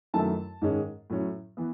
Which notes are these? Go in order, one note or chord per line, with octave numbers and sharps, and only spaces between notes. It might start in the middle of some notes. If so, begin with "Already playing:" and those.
F#2 D#3 F#3 A3 E4 A5
G#2 D#3 G#3 C#4
A2 F#3 C#4
E3 B3